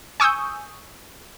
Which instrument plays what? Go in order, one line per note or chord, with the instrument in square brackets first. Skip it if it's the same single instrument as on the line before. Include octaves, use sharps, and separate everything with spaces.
[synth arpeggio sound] G#5 C#6 D#6 E6 G6